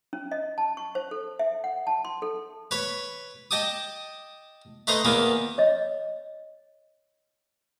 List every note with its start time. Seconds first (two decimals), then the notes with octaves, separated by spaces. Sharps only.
0.13 C#4
0.31 D#5
0.58 A5
0.77 C#6
0.95 C5
1.11 A4
1.39 E5
1.64 F#5
1.87 A5
2.05 C6
2.22 A4
2.71 B4 C#5 B5
3.51 D#5 G5 A5 D6 D#6
4.87 A3 B4 C5 D#5 A#5 C6
5.05 E2 A#3 B3 D#6
5.58 C#5 D#5